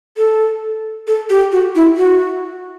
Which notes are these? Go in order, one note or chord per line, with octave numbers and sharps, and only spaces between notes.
A4
A4
G4
F#4
E4
F#4